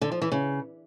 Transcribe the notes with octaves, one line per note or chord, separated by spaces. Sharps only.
D3
F3
E3
C#3